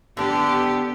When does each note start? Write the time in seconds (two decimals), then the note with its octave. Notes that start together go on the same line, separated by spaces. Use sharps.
0.17 D3 B3 D4 G4